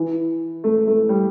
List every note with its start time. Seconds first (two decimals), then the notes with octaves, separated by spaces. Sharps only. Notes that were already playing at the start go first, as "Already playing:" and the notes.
Already playing: E3
0.64 A3
0.87 A3
1.09 G3